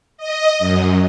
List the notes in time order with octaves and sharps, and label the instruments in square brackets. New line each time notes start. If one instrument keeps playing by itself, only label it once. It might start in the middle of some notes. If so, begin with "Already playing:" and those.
[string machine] D#5
F#2